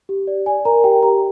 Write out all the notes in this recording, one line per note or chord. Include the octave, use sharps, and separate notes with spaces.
G4
D5
D5 G#5
A#4 A#5
G4 G5
G4 A#5